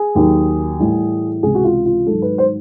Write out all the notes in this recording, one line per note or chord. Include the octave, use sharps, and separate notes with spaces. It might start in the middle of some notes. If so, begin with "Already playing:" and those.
Already playing: G#4
D#2 D#3 F#3
A2 E3 G3
C#2 C3 E3 G#4
F#4
F4
F4
G#2 D#3 F#3 A4
B4
C5